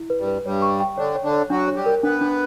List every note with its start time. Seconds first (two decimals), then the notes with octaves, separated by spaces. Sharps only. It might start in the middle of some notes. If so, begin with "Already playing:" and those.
Already playing: E4
0.10 B4
0.19 G2 G3
0.27 B4
0.45 G2 G3 C#5
0.62 C#6
0.80 G5
0.97 D3 D4 C#5
1.15 C#5
1.24 D3 D4
1.33 C#5
1.50 F#3 D4 F#4
1.68 C#5
1.76 G3 G4
1.86 A#4
2.03 B3 D4 B4
2.21 D4